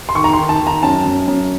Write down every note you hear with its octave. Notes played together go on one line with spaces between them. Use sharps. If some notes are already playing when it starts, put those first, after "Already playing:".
C6
D#3 C#6
A#5
C6
D#3
A5
D#3
A#5
F#2 A5
F#2
F#2